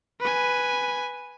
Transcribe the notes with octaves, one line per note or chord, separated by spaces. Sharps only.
B4 G#5